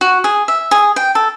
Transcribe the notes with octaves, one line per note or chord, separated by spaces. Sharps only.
F#4
G#4
E5
G#4
G5
A4